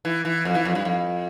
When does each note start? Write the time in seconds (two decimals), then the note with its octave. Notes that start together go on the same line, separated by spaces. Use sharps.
0.05 E3
0.25 E3
0.45 F2
0.55 E3
0.65 F2
0.75 G2
0.85 F2